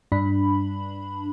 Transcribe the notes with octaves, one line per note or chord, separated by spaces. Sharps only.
G2 D4 B5